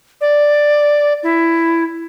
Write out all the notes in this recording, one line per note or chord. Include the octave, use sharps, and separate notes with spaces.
D5
E4